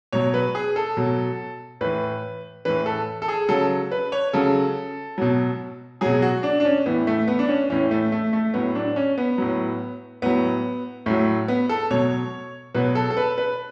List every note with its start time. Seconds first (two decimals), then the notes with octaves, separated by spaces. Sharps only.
0.12 B2 F#3 C#5
0.34 B4
0.55 G#4
0.76 A4
0.97 B2 F#3
1.81 A2 E3 B4
2.65 A2 E3 B4
2.86 A4
3.22 A4
3.28 G#4
3.49 C#3 F#3 A4
3.91 B4
4.12 C#5
4.33 C#3 F#3 A4
5.18 B2 F#3
6.01 B2 F#3 G#4
6.22 F#4
6.43 D4
6.60 D4
6.65 C#4
6.86 A2 E3 B3
7.07 A3
7.28 B3
7.39 D4
7.49 C#4
7.70 A2 E3 C#4
7.91 A3
8.12 A3
8.33 A3
8.54 A2 F#3 B3
8.75 D4
8.96 C#4
9.18 B3
9.38 A2 F#3
10.22 A2 F#3 B3
11.06 A2 F#3 A3
11.48 B3
11.69 A4
11.91 B2 F#3 C#5
12.74 B2 F#3 B4
12.95 A4
13.11 A4
13.17 B4
13.38 B4